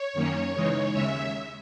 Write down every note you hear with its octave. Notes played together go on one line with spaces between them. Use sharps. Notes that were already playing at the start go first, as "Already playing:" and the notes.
Already playing: C#5
F#2 D#3 A#3 C#4
C#3 E3 G#3 D#4
D#2 C#3 G#3 E5